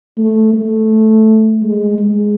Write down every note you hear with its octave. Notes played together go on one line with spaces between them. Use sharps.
A3
A3
G#3
G#3